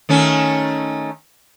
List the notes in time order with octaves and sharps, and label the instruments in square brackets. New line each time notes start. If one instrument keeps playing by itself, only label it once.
[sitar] D#3 A3 C#4